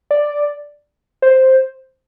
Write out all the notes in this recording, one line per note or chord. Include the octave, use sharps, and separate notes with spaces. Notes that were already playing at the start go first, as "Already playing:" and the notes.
D5
C5